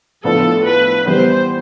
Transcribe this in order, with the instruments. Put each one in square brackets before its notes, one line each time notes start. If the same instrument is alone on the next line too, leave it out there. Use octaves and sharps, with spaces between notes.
[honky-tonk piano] A2 F3 B3 D4 F4 [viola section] A4
[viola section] B4
[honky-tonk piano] E3 G3 B3 [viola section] C5